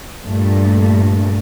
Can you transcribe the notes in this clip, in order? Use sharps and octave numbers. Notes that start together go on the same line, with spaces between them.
G2 A#2 A3